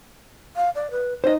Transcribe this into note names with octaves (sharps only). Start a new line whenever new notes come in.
F5
D5
B4
D#4 C5 D#5